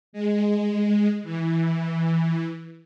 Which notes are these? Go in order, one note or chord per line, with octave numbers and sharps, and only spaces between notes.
G#3
E3